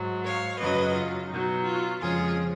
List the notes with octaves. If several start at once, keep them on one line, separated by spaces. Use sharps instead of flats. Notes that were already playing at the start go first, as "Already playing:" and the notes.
Already playing: G#2 F#3
C#5 F5
F#2 C#3 F#3 B4 D#5
F4
B2 F#3 D#4
F4
F2 C#3 F3 G#3 F4 G#4